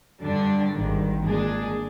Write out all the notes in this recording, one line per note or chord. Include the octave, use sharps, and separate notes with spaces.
G2 D3 G3 D4
G#1 G2 D#3
A#2 G#3 D4 G#4